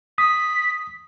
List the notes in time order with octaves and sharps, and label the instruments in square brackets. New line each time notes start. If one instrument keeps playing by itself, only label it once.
[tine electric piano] D#6 [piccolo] B6